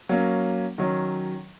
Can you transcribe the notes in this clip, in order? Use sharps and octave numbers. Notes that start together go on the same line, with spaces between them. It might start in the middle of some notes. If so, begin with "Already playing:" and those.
F#3 A#3 C#4
D#3 F#3 C#4